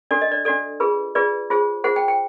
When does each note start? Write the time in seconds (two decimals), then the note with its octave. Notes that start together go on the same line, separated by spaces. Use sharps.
0.11 D4 F#4 A4 D5
0.21 D#5
0.32 D5
0.45 D4 F#4 A4 D5
0.80 F4 G#4 B4
1.15 F4 G#4 B4 D5
1.50 F4 G#4 C5
1.84 F4 G#4 C5 F#5
1.96 G5
2.08 G5